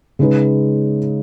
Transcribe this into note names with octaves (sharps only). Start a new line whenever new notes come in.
C#3 G#3 D#4 G#4 B4